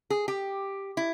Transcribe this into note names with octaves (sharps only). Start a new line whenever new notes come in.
G#4
G4
E4